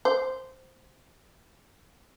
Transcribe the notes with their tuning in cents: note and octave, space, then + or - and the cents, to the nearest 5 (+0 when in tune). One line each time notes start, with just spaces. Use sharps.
C5 -5